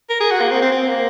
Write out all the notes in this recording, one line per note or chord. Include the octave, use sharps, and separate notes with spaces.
A#4
G#4
F#4
A#3
C4
C4
C4
A#3